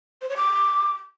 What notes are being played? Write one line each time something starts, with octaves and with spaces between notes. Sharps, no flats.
C5
C#5
D6